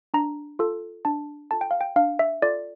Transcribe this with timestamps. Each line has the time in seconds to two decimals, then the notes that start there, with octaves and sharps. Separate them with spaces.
0.14 D4 A#5
0.59 F4 A4
1.05 D4 A5
1.51 F4 A4 A5
1.61 G5
1.71 F5
1.81 G5
1.96 D4 F5
2.19 E5
2.42 F4 A4 D5